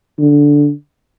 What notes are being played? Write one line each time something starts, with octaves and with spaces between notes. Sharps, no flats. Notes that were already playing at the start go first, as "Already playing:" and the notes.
D3